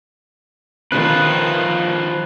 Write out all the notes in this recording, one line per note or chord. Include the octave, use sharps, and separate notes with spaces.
D#3 F3 F4 B4 F#6